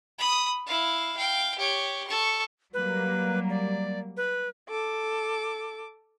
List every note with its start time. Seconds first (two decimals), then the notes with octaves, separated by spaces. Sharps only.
0.18 B5 D#6
0.66 E4 F5
1.16 F5 G5
1.58 G4 C#5
2.07 A4 C#6
2.74 F#3 G3 A#3 B4
3.49 D5
4.17 B4
4.70 A4 D6